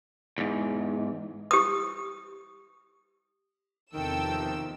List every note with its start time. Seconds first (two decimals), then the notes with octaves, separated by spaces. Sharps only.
0.38 E2 G#2
1.51 G4 D#6
3.94 E2 C3 D#3 F3 A4 G5 E6